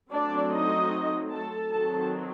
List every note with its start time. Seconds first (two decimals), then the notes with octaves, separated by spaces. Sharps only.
0.12 F#3 A3 C4 D4 D5
0.52 D#4 D#5
1.32 A4 A5
1.71 D#3 F#3 C4 A4 A5